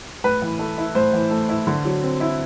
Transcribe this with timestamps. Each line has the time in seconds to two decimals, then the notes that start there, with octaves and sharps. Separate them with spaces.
0.24 A2 B4
0.42 E3
0.59 A3
0.78 E4
0.95 A2 C5
1.13 E3
1.31 A3
1.49 E4
1.67 D3
1.85 F#3
2.03 C4
2.20 E4